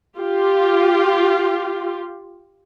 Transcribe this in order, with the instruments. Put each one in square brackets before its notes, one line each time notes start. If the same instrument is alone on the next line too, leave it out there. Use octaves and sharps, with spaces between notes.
[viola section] F4 G4